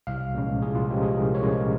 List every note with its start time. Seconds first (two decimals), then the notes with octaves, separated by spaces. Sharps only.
0.07 C2 F5
0.34 A#2 F3 G#3 C#4
0.62 C2 G#4
0.75 F4
0.89 A#2 F3 G#3 C#4 G4
1.02 G#4
1.16 C2 A#4
1.35 C#5
1.43 A#2 F3 G#3 C#4
1.52 F5